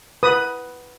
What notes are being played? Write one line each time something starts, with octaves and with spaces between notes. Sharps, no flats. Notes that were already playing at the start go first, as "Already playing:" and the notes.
B4 D#6